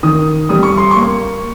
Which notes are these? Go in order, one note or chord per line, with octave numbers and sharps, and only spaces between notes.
D#3 D#6
G3 D#6
C#6
C6
C#6
A#3